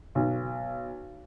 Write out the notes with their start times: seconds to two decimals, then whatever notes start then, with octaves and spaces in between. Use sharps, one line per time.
0.15 B1